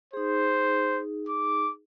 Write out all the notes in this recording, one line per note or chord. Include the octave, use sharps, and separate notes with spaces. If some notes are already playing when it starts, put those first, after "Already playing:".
D#4 G#4 C5
D6